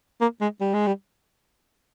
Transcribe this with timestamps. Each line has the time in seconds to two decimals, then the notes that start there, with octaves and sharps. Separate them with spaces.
0.21 A#3
0.41 G#3
0.61 G3
0.74 G#3
0.87 G3